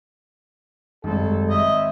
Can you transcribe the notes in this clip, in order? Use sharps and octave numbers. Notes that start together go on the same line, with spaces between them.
G#1 F#2 D#3 G3 G#3 A4
D#5 E5